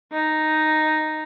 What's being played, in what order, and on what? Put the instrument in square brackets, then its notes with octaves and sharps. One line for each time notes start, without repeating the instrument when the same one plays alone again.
[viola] D#4